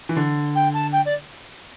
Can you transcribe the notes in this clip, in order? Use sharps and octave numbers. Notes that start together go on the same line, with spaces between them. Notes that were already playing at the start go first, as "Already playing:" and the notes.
E3
D3
G5
A5
G5
D5